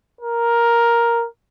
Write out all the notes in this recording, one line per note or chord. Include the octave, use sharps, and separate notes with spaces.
A#4